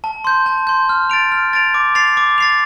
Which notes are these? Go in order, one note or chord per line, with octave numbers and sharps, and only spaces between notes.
A5
C6 G6
A5
C6 G6
F6
A6 D7 F7
F6
A6 D7 F7
D6
A6 C7 F7
D6
A6 C7 F7